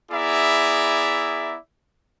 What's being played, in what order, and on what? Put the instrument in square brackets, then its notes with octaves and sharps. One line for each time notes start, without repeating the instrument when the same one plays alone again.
[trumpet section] B3 E4 G#4 D5 E5 A#5